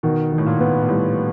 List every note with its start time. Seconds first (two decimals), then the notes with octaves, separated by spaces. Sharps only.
0.03 B2 D#3
0.32 D#3
0.38 A2
0.46 A#2
0.60 B3
0.83 A#2
0.89 A2 G3